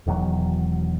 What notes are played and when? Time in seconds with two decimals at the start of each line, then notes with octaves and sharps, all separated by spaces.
0.07 E1 E2 D#3 F#3